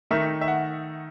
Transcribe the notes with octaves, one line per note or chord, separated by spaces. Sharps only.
D#3 A3 D#4 E5
E5
F#5